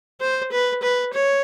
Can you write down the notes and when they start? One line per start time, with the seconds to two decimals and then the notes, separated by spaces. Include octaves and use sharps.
0.21 C5
0.52 B4
0.83 B4
1.13 C#5